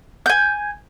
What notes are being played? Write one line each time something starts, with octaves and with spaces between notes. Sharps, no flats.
G#5 G6